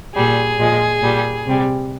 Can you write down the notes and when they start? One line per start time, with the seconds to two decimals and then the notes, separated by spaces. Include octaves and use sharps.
0.15 A#2 G3 G#4
0.59 A#2 F3 G#3
1.02 A#2 G3
1.46 C3 G3